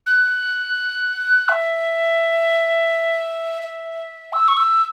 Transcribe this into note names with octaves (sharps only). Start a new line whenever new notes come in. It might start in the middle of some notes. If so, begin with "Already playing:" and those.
F#6
E5
E5
E6
C#6
E6